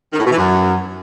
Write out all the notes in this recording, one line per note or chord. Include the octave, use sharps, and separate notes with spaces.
D#3
A2
B2
E3
F#2